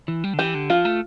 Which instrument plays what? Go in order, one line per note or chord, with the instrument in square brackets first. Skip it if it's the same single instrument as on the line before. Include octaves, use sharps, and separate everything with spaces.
[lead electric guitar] E3
G3
D3
[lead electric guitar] E3 [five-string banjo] G4
[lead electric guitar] D3
[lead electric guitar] F3 [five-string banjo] F4
[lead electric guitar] A3